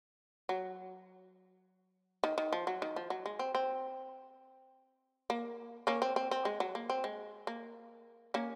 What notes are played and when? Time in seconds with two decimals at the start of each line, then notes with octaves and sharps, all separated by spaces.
0.49 F#3
2.24 D#3
2.38 D#3
2.53 F3
2.67 F#3
2.82 D#3
2.96 F3
3.10 F#3
3.26 G#3
3.39 C4
3.55 C4
5.30 A#3
5.87 A#3 C#4
6.02 C4
6.16 C4
6.31 C4
6.45 G#3
6.60 F#3
6.75 A#3
6.90 C4
7.04 G#3
7.47 A#3
8.34 A#3 C#4